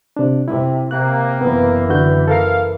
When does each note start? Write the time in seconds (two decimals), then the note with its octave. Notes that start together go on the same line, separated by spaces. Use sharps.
0.17 C3 D4
0.48 C3 E4
0.91 C3 A#3 F#6
1.41 F#1 E3 B3
1.89 D3 F#4 G6
2.28 A4 A#4 F5